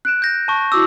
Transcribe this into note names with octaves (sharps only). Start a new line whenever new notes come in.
F#6 D7 E7
G6 A#6
A5 C#6
E4 F#4 D6 E6